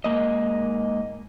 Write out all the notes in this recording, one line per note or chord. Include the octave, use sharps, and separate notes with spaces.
G#2 A#3 D#5